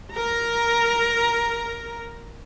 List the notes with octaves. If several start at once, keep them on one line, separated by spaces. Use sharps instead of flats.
A#4 A#5